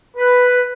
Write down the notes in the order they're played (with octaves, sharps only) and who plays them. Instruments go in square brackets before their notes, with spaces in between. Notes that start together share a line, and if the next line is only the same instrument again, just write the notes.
[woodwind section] B4